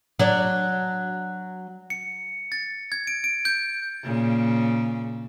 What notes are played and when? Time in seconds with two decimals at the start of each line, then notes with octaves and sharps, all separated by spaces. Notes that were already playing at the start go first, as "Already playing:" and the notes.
0.19 F#3 D4
1.90 C#7
2.52 A6
2.92 G#6
3.07 D7
3.24 D7
3.45 G6
4.04 A#2 C#3